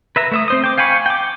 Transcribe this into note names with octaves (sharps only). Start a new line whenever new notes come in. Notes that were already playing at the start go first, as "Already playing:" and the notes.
B4 E5 A#5
A3 E5 D#6
C4 C5 D#6
G5 D6
F5 G5 G#5 B5 C#6
G5 D6